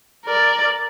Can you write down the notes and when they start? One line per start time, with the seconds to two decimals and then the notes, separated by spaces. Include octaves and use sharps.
0.25 A#4 D5